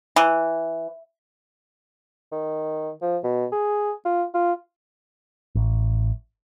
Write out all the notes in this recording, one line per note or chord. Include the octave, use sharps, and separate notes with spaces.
E3
D#3
F3
B2
G#4
F4
F4
A1